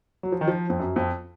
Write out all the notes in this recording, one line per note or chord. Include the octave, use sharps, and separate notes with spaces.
F#3
F3
D#3
F3
F2
F#2
F2